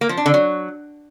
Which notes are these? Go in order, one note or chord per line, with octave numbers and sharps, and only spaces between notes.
A#3
F3
D4
D3
F#3